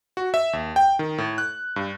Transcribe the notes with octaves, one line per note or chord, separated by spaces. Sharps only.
F#4
E5
D#2
G5
D#3
A2
F#6
G2